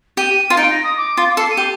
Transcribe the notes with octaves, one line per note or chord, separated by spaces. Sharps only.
G4 D#7
F4
D#4 D7
A#6
D#6
D6
F4
A4 C7
D#7
G4